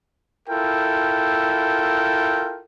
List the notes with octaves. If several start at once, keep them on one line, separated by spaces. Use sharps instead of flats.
E4 F4 A4 A#4 G5